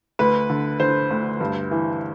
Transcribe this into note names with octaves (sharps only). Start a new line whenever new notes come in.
D2 B4
D3
D3 C5
D2
G2
E3